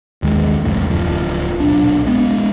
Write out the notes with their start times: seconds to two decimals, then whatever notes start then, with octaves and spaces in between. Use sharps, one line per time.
0.22 A1 D#2 D#3 G#3
0.65 F1 C2 F2 A2
0.90 D1 F3
1.60 D#1 B1 D4
2.07 G#3 B3